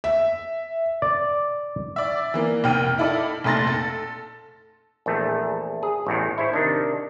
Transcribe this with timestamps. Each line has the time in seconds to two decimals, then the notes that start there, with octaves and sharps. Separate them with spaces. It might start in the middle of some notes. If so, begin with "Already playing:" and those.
0.04 E5
1.02 D5
1.96 D5 E5
2.34 E3 A#3
2.64 F1 A#3 G5 F6 D#7
2.98 D#4 E4 A4 D5
3.44 F1 A#2 A3 C6 A6 A#6
3.67 A4
5.06 A#1 E2 A3
5.83 G#4
6.07 A1 E2 A2
6.38 E4 C5 C#5
6.53 C3 D#3 D4